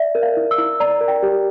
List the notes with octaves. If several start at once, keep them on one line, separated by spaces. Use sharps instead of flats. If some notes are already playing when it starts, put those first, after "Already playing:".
Already playing: D5 E5
A#4
F5
E4
E6
E4
D5 A#5
A#4
G5
G4